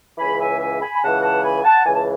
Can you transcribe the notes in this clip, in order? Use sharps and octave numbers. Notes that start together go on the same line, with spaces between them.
C#2 C#3 E3 G#5 B5
E5 G#5
E5 G#5
G#5 B5
B5
C#2 C#3 E3 F#5 A5
F#5 A5
G#5 B5
F#5 A5
C#2 C#3 E3 G#5
A5